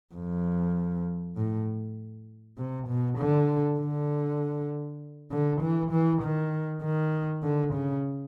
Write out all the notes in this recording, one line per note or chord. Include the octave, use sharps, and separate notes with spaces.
F2
A2
C3
B2
D3
D3
D3
E3
E3
D#3
D#3
D3
C#3